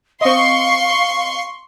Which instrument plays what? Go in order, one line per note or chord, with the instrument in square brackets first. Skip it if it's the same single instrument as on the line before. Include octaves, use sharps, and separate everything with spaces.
[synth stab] C4 D#5 [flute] F5 [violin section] C6 C#6